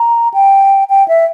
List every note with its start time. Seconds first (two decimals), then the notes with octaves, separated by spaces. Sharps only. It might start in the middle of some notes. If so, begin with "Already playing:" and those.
Already playing: A#5
0.34 G5
0.90 G5
1.08 E5